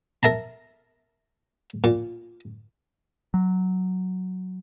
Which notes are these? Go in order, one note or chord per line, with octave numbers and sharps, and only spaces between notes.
A#4 E5 A5 A#5
A#2
F#3